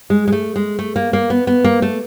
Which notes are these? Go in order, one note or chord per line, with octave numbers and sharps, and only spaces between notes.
G#3
G#3
A3
G#3
A3
A#3
A#3
B3
B3
A#3
A3